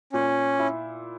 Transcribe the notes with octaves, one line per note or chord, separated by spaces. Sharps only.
A#2 C#4
E4